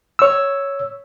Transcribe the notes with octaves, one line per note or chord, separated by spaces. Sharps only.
C#5 E6